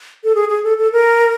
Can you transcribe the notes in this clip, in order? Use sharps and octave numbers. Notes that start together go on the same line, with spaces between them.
A4
G#4
G#4
A4
A4
A#4